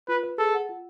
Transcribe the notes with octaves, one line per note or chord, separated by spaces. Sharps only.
F4 B4
B4
G#4 A4
F#5
F4